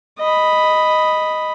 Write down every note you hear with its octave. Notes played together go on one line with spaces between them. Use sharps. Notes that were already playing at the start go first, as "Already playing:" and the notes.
D#5 B5